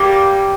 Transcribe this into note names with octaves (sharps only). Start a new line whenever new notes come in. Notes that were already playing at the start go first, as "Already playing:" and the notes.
Already playing: G3 A#3